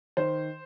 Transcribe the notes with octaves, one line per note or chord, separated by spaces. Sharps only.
D#3 C5